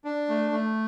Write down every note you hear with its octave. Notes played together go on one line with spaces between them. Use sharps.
D4
A3
A3